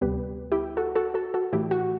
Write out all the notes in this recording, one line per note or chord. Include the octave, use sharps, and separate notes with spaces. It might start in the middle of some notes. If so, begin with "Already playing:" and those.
D2 C3 G3 B3 G4 B4
E4 G4
F#4 A4
F#4 A4
F#4 A4
F#4 A4
A2 E3 A3 E4 G4
F#4